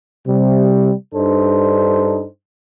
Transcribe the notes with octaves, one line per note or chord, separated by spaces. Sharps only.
C3 G3
G2 D4 D#4 A4 C5